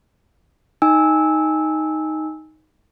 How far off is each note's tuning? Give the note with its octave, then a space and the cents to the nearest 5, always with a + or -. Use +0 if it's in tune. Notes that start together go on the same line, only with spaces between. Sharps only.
D#4 +5 G#5 -15 E6 -15